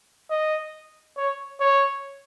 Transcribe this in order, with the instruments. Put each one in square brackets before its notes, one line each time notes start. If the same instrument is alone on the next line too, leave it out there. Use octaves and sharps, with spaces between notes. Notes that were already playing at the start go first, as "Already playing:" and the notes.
[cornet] D#5
C#5
C#5